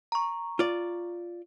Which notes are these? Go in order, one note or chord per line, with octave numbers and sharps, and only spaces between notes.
A#5 C#6
F4 D5